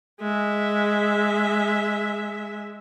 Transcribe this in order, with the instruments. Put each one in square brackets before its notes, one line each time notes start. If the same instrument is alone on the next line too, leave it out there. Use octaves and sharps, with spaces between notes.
[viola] G#3 E5